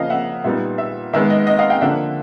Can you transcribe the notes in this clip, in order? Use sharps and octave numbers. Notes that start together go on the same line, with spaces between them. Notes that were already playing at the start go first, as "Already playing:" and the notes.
Already playing: C#3 F3 A#3 D#5 F5
E5 F#5
A#2 G3 B3 D#4 E5
E5
D#3 G#3 B3 E5
D#5
D#5
D#5 F5
F5 G5
D3 F3 A#3 D4 E5 F#5